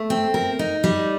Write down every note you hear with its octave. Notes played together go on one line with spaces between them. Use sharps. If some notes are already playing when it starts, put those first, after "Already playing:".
Already playing: A3
C4
A#4
D#4
G3